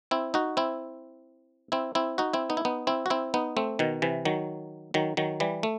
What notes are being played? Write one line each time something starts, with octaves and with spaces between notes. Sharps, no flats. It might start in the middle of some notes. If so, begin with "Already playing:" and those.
C4 E4
D#4 F#4
C4 E4
C4 E4
C4 E4
D#4 F#4
C4 E4
B3 D#4
E4
B3 D#4
C4 E4
F#4
C4 E4
B3 D#4
A3 C4
B2 D#3
C3 E3
D#3 F#3
D#3 F#3
D#3 F#3
E3 G3
A3